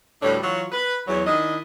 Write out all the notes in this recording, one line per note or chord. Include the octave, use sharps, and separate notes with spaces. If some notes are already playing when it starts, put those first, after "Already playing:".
D2 A2 G3 D4 B4 C#5
E3 F#3 F4 F#4
B4
E2 F#3
D#3 D4 E4 D#5